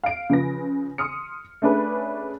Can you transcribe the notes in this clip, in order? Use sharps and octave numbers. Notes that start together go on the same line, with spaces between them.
F5 D7
C#3 F3 B4 A#6
C6 D#6 F6 C#7
A3 C#4 D4 G#4 B4